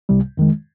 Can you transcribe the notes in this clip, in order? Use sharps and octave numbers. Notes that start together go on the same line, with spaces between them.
C2 C3 G3
F2 D#3 G#3